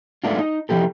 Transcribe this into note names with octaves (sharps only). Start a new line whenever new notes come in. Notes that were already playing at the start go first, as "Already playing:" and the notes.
G#3 A3 B3 D4 D#4 F4
D#4
C3 E3 F3 B3 G4 A4